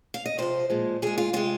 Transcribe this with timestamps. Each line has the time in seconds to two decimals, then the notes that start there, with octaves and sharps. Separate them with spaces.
0.14 F5
0.26 D#5
0.38 C3 F3 G#3 C5
0.70 A#2 F3 G#3
1.02 A#2 G#3 G#4
1.18 F4
1.33 C3 G#3 F4